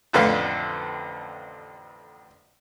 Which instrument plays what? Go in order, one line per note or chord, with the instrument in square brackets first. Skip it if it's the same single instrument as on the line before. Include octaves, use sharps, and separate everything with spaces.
[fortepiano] A1 F2 D3 A4 B4 F5